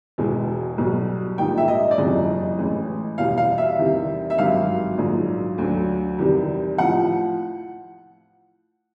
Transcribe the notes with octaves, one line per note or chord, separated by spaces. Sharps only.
E1 E2 B2 G#3
B1 B2 G3
A#1 G#2 D#3 G3 G5
E5
D#5
D5
F#1 F2 C3 E3 G#3 D#5
A1 A2 E3 G#3
E2 B2 G3 F5
F5
E5
E2 C3 D#3 G3
E5
G#1 G2 D#3 F#3 F5
A#1 G#2 D#3 F#3
D2 D3 F#3
E2 C3 D#3 G3
A2 F3 F#5